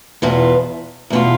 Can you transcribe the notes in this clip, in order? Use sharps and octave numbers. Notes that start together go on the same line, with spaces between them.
E2 B2 B3 F4
E2 B2 B3 F4